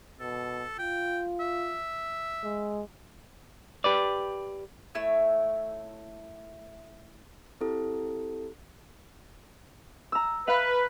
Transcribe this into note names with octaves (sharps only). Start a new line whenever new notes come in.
B2 A4
F4 G5
E5
G#3
G4 B4 D5
A3 E4 C#5 E6
C4 E4 G4 A4
A#5 E6
B4 F5